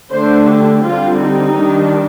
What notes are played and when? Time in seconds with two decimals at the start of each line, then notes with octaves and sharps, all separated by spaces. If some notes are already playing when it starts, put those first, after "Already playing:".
0.12 D3 A3 D4 C5
0.48 G4
0.83 D3 G3 C4 F4
1.19 D#4
1.56 D#3 G3 D4